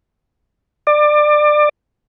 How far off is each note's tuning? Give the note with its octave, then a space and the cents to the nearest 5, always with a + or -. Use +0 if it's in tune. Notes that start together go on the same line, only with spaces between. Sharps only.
D5 +25